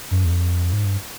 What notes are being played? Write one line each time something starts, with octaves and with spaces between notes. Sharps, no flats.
F#2
E2
F2
G#2
G2